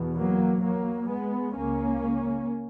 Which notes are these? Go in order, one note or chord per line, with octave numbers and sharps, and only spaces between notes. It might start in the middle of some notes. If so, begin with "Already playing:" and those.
Already playing: E2 B2
F#3 A#3
F#3 A#3
G#3 B3
C#2 C#3 A#3 C#4